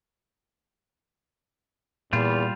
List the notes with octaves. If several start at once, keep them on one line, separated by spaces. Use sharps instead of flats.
E2 A#2 G3 F4